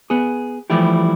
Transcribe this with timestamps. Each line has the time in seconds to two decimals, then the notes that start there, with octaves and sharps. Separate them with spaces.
0.10 B3 G#4
0.70 E3 F3 G3 A3 E4 G4